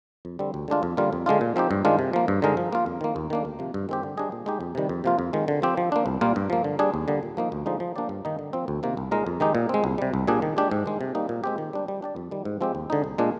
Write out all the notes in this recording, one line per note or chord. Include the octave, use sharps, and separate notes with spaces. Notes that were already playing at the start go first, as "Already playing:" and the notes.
F2
D3 G3 C4
D2
D3 G#3 D4 F4
F2
D3 G3 A#3 F4
F2
D3 G#3 D4 F4
A#2
F3 C4 D#4 G4
G2
D#3 G#3 D4 F4
C3
F3 A#3
G2
D3 G#3 D#4 A#4
F3
A#3 F4
F2
D#3 A#3
D#2
D#3 A#3 D4
D2
C3 F3
G2
D#3 G#3 C4 G4
D3
G3 D4 G#4 D#5
A#2
G#3 D#4 G4
F2
C3 D#3 G3
F2
C3 F3 A#3 F4
F2
D#3 G#3
D3
F3 C4 G4
F3
A#3 D4
C2
A#2 G3 A#3 F4
G2
F3 A#3
D3
G3 D4 G#4
D#2
D3 G3 A#3
A#2
F3 A#3 D#4
D2
D3 F3 G#3 D#4
F3
A#3 D4 G4 D5
G2
D#3 A#3 D#4
D3
F3 C4
D2
C3 D#3 A#3 F4
C2
A#2 G#3 D#4 A#4
F2
D#3 G#3 D#4 G4
A#2
G#3 C4
C2
C3 G3
C2
A#2 G3 D4 G#4
D#3
G#3 D4 G4
G#2
D#3 G#3
C3
G3 A#3 D#4
A#2
G#3 C4 G4
D#3
G3 D4
G3
D4 G4 D5
F2
D#3 G3
G#2
F3 G#3 C4 G4
D#2
D3 G#3 D#4
C2
A#2 G#3 D4